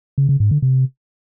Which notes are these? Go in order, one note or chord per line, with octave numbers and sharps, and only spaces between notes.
C#3
C#3
G#2
D3
C3